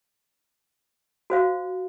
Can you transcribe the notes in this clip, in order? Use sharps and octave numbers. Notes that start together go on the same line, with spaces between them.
F#4 C5 F5